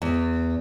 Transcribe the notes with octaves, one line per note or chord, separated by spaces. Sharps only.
E2